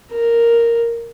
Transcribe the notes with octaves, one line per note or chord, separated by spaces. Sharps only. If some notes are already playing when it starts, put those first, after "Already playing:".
A#4